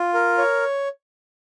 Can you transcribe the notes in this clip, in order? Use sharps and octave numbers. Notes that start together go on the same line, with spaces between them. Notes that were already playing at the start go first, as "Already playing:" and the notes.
Already playing: F4
A#4
C#5